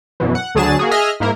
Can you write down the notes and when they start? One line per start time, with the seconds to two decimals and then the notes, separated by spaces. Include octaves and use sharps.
0.20 F#2 B2 E3
0.35 F#5
0.55 D2 D3 F#3 G#4 A5 E7
0.79 A#3 F#4 G#4
0.91 G#4 D#5 E5 F6
1.20 G#2 A#3 E4 A#4